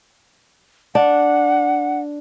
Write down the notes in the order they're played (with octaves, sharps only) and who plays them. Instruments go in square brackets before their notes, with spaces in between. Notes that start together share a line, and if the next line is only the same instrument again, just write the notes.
[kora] D4 [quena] F#5